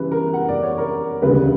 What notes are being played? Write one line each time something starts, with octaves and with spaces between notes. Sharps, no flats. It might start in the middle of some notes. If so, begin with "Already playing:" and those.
Already playing: C#3 E3 G3 B4
A#4
F#5
D5
C#5
A#4
E1 D2 C#3 G3 B4